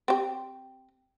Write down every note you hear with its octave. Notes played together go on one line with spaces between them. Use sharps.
C4 G4